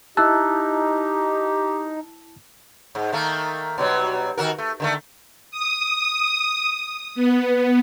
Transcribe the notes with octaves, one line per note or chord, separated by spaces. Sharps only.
D#4 E4 G4 A5 E6 F#6
G#2
D#3 A3 A#3
B2 F#3 G3
D#3 F#4 A#4
A3
D3 D#3 A3
D#6
B3